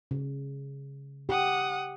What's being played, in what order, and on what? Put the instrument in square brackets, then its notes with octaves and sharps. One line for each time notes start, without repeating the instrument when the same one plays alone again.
[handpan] C#3
[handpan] G4 [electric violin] F#5 D#6